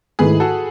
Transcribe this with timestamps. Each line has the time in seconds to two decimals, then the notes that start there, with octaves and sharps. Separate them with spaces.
0.19 G#2 D#3 A3 E4 G#4 B4
0.40 F#4 A4